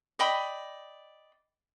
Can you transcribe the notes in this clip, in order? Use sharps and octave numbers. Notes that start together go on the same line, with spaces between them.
D5 D#5 G5 B5